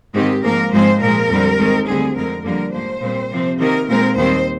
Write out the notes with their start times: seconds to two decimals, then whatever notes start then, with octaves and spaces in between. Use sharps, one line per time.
0.14 G#2 D#3 G#3 C4 G4
0.43 G#2 F3 A#3 A#4
0.72 G#2 F3 G#3 C4 C5
1.01 A#2 F3 G#3 A#4
1.29 F2 D3 G3 C4
1.57 G#2 D#3 G#3 C4
1.86 D2 D3 G3 C4 G#4
2.15 F2 D3 G#3 C4 A#4
2.44 F2 D3 G3 A#3 A#4
2.72 G#2 F3 A#3 C5
3.01 A#2 G3 C4
3.30 C3 F3 C4
3.58 C3 D#3 A#3 A#4
3.87 A#2 G#3 C4 A#4
4.16 D#2 D#3 G3 C4 C5